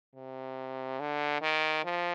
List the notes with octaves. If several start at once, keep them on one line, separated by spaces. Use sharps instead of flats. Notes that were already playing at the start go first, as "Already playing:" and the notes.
C3
D3
D#3
F3